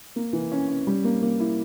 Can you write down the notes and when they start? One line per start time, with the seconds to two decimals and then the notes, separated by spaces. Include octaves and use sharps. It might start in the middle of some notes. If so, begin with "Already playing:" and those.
0.16 A#3
0.33 E3
0.52 C#4
0.69 C#4
0.87 G3
1.04 A#3
1.22 A#3
1.40 E4